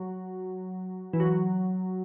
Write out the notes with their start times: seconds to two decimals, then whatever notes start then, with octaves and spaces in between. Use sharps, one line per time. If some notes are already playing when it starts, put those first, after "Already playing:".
Already playing: F#3
1.13 E3
1.20 F#3